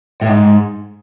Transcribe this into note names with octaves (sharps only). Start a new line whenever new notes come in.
A2
G#2